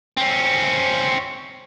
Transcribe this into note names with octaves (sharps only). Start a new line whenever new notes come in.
C4 C#4